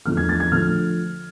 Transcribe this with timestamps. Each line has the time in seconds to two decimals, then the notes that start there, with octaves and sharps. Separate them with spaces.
0.06 E2 D3 F3 A3 F6
0.17 G#6
0.29 A6
0.40 G#6
0.51 D3 F3 A3 F6